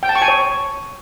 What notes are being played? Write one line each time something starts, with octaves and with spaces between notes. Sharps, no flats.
G5
A5
C#6
G#5
C#5